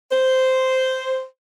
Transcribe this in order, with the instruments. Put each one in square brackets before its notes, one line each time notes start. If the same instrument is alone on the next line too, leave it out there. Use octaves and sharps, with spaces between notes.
[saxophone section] C5